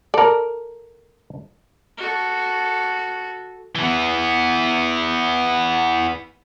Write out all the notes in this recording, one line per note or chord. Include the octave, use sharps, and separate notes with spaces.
A4 A#4 D5
F#4 A4
E3 B3